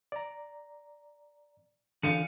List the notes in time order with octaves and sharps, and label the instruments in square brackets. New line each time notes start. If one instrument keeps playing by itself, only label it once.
[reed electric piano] D5 A#5
[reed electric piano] D3 F4 [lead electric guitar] E3 F5 [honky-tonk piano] C#7 D#7